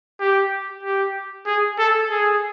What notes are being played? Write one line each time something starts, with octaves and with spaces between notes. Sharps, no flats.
G4
G4
G#4
A4
G#4